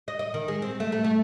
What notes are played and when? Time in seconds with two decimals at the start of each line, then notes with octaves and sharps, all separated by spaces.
0.08 D#5
0.19 D#5
0.34 D#3
0.48 G#3
0.62 C4
0.80 A3
0.92 A3
1.04 A3